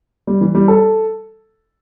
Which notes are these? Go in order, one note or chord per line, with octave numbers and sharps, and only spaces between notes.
G3
E3
G3
A4